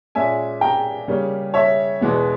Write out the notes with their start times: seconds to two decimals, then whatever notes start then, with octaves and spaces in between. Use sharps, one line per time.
0.15 A#2 G#3 C#4 E5 G#5
0.61 G5 A#5
1.08 C#3 G3 A#3 C#4
1.54 C#5 E5
2.01 E2 B2 G#3 B3